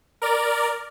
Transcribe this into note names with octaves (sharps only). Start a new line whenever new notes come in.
A#4 D5